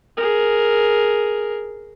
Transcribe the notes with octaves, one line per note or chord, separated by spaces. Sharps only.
G#4 A#4